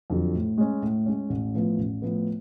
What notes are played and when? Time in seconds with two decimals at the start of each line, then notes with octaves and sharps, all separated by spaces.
0.10 F2 D3 F#3
0.34 A2
0.58 G#3 C#4
0.82 A2
1.06 G#3 C#4
1.30 A1
1.54 A2 F3 B3
1.78 A1
2.02 A2 F3 B3